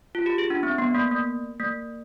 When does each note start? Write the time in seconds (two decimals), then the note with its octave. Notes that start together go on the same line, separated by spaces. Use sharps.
0.15 F4
0.26 G4
0.38 G#4
0.50 D4
0.63 C4
0.78 B3
0.91 B3
0.94 A#3
1.11 A#3
1.60 A#3